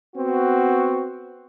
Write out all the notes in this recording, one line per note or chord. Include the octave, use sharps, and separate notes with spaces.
B3 C4 F#4